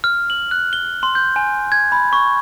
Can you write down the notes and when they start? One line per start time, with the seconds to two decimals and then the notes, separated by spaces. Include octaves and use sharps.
0.04 F6
0.30 F#7
0.51 F#6
0.73 G7
1.03 C6
1.15 G6
1.36 G#5
1.72 G#6
1.92 B5
2.13 C#6